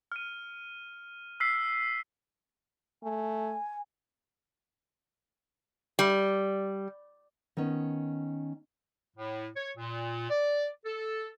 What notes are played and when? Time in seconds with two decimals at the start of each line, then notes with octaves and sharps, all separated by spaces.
0.12 F6 D#7
1.40 E6 F6 B6 C7
3.03 A3 G#5
5.99 G3
7.57 D#3 B3 C#4 D#4
9.17 A2
9.56 C#5
9.77 A#2
10.30 D5
10.85 A4